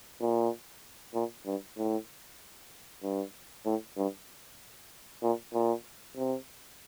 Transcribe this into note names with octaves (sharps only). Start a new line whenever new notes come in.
A#2
A#2
G2
A2
G2
A2
G2
A#2
A#2
C3